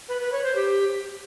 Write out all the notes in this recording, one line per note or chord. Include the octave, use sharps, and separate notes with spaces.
B4
B4
C#5
C5
G4